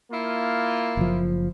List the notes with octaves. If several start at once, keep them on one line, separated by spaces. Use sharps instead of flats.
A#3 E4 F4
F#1 F3